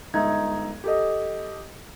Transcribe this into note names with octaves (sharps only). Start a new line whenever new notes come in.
G1 G#3 D#4 E5 G#6
G4 A4 D#5